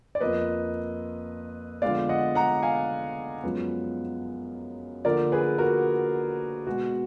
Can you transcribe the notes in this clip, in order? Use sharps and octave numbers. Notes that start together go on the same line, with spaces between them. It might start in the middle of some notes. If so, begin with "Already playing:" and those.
D5
F2 F3 A#3 B4 D#5
D3 F3 G#3 B3 D5 F5
D#5 F#5
F#5 A#5
F5 G#5
F#2 F3 G#3 B3
D3 F3 A#3 A#4 D5
G#4 B4
F#4 A#4
B2 G#3 B3 F#4